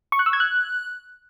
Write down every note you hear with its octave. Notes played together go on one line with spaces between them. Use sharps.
C#6
F#6
E6
G#6
F#6